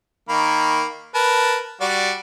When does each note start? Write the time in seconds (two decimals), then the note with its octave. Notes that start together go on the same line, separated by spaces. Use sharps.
0.29 D#3 A#3 B5
1.15 A#4 B4 A5
1.81 G3 F#4 D5